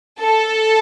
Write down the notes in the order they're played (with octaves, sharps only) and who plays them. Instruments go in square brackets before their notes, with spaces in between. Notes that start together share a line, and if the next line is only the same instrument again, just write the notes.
[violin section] A4